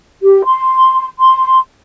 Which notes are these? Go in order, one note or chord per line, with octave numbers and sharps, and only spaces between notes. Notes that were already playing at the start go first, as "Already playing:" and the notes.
G4
C6
C6